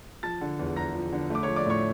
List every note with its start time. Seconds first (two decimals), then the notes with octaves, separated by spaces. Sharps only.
0.23 F3 A5 A6
0.41 D3
0.59 E2
0.76 E2 A#5 A#6
0.94 F3
1.12 D3
1.30 A3 D6
1.43 F3 C#5 C#6
1.56 D5 D6
1.66 A2 C#5 C#6